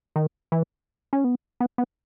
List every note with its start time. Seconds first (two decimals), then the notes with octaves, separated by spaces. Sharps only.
0.16 D#3
0.52 E3
1.13 C#4
1.24 B3
1.60 B3
1.78 B3